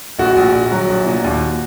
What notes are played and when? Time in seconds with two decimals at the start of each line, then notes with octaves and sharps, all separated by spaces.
0.19 A#1 F#4
0.36 A#1
0.55 A#1
0.72 F#3
0.89 A#1
1.06 A#2
1.25 D#2